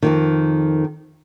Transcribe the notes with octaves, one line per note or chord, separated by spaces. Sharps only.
F2 G#2 D#3